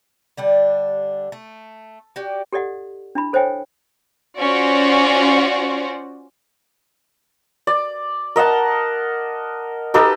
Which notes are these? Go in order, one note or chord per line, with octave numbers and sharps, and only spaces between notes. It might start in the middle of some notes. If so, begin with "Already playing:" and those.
D3 G3 D4
A3
F#4 G4 D5
G4 A4 D5 D#5 F#5
D4 E4 B5
A4 C5 C#5 D#5 G5 G#5
C#4 F4 F#4 C5 D5
D5
A#4 D#5 F#5 A5
D#4 G4 A4 B4